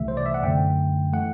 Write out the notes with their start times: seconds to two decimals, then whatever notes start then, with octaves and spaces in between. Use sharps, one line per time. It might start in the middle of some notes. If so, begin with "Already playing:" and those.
Already playing: C2 C3 E3 A3 E5
0.08 C5
0.17 D5
0.26 E5
0.34 F#5
0.43 F#2 D3 A3 G5
1.13 E3 A3 F#5